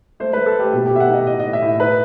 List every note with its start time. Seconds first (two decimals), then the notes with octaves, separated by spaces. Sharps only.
0.20 A3 C5
0.33 A3 B4
0.46 A4
0.55 A3 G4
0.73 B2 G4
0.86 B2 G4
0.96 E5
1.00 F#5
1.09 D#4 D#5
1.26 A2 D#5
1.40 A2 D#5
1.53 E5
1.62 A2
1.80 D#4 B4